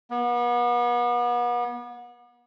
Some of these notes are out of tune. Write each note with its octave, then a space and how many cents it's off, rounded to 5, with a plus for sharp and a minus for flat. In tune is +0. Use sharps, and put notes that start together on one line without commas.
B3 -35